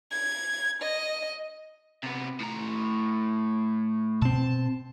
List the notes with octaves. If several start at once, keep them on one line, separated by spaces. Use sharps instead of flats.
G#6
D#5
C3 B3
A2 A#5
B2 C4 A5